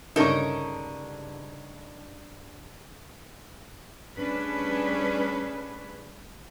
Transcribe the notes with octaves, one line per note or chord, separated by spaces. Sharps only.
C#2 G2 D3 C#4 D#4 A#4 C#6 E7
G3 A3 C#4 D4 G#4 B4